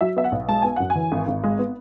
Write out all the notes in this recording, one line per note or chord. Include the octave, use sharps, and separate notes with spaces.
F#3 E5
B3 E5
F#5
B1
G#3 A5
B3 G#5
F#2 F#5
G#5
E3
G#1
G#1
G#3
B3